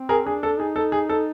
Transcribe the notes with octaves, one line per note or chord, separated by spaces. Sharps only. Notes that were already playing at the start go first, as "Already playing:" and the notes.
Already playing: C4
G#4 A#4
D4 G#4
A4
D#4 G#4
A4
G#4
A4